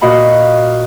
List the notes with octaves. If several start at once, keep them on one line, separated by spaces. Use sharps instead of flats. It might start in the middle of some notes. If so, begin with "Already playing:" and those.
A#2 F#4 D#5 F5 B5